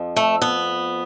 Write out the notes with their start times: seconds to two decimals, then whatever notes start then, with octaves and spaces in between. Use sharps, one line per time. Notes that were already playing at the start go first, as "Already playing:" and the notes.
Already playing: F2 F3
0.16 A3
0.42 B3